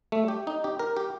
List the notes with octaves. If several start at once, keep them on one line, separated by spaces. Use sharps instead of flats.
A3
G4
D#4
G4
A#4
G4